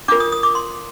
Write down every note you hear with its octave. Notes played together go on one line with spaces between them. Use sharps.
D4 F4 A#4 D6
D#6
D#6
D6
C6